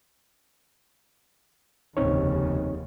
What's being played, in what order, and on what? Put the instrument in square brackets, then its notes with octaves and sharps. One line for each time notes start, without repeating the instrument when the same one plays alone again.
[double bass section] F1 D#2 C#3 [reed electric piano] C4 D#4 C#5